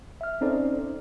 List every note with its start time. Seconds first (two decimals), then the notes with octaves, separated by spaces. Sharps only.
0.21 E5 F6
0.41 C4 C#4 D#4 A4 C5 D5